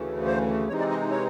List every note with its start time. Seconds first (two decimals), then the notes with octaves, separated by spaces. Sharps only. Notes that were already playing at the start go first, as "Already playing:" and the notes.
Already playing: D2 C#3 E3 A3
0.26 C5
0.68 C3 E3 G#3 C4 D#4 C#5
0.79 D5
0.90 D#5
1.11 C#5